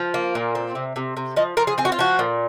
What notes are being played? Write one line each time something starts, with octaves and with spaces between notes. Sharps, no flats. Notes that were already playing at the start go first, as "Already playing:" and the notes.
Already playing: F3
A#3
A#2
C4
C3
C3
C3
F3 D#5
F3 A#4
G#4
C4 G#4
F#4
F4
F3 F#4
A#2